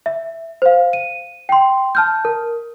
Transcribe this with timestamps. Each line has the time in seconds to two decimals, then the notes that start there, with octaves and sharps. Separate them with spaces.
0.06 E5
0.62 C5 F5
0.93 D#7
1.49 G5 C6
1.95 A5 F6 G6
2.25 A#4